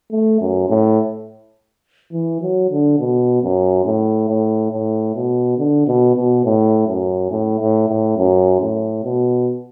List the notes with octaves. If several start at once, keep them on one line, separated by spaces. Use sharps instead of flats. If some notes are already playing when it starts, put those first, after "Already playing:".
A3
F#2
A2
E3
F#3
D3
B2
F#2
A2
A2
A2
B2
D3
B2
B2
A2
F#2
A2
A2
A2
F#2
A2
B2